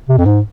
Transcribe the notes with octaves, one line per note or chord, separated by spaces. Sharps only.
C3
F2
G#2